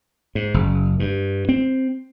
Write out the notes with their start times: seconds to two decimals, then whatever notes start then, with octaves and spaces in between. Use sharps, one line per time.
0.35 G#2
0.54 F#1
1.00 G2
1.49 C4